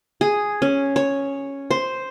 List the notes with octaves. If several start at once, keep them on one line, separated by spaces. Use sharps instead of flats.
G#4
C#4
C#5
C5